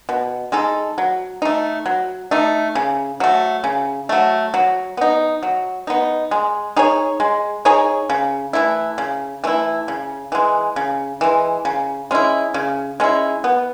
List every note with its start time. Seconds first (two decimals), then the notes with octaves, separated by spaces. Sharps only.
0.09 B2
0.52 G#3 D#4 A4
0.98 F#3
1.42 A3 D#4
1.86 F#3
2.31 A3 D#4
2.75 C#3
3.20 F#3 A3
3.64 C#3
4.09 F#3 A3
4.54 F#3
4.97 B3 D#4
5.43 F#3
5.87 B3 D#4
6.31 G#3
6.76 D#4 G#4 C#5
7.20 G#3
7.65 D#4 G#4 C#5
8.10 C#3
8.53 E3 A3 E4
8.98 C#3
9.44 E3 A3 E4
9.88 C#3
10.32 E3 G#3
10.76 C#3
11.21 E3 G#3
11.65 C#3
12.11 G#3 C#4 E4
12.54 C#3
13.00 G#3 C#4 E4
13.44 B3